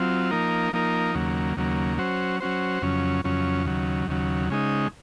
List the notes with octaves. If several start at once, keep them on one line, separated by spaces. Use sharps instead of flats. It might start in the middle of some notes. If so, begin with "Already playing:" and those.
Already playing: F#3 C4 F4
F3 A#3 D#4 A#4
F3 A#3 D#4 A#4
D#2 C#3 F#3 A#3
D#2 C#3 F#3 A#3
F#3 C#4 F#4 C5
F#3 C#4 F#4 C5
F2 C#3 F#3 C#4
F2 C#3 F#3 C#4
D#2 C#3 F#3
D#2 C#3 F#3
C#3 G#3 D#4